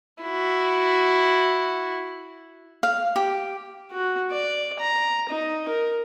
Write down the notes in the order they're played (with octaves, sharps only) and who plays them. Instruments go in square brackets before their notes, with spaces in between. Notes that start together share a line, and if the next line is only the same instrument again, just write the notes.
[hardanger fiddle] E4 F#4
[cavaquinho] F5
G4
[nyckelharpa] F#4
D5
A#5
D#4
A#4